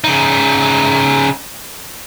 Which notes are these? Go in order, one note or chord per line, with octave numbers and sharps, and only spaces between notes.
C#3 D#4